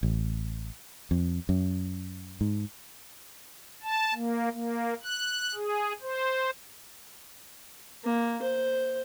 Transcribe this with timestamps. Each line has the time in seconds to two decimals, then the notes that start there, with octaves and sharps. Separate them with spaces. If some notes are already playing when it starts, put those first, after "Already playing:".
0.03 A1
1.11 F2
1.49 F#2
2.41 G#2
3.83 A5
4.15 A#3
4.53 A#3
5.03 F#6
5.55 G#4
6.02 C5
8.05 A#3
8.42 C5